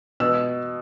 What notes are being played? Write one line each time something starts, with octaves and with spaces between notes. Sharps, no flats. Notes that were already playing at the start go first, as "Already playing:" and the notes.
B2 E6